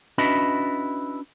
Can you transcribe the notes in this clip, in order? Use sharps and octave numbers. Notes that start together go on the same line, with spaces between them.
C#4 D4 E4 F#4 B4 D#5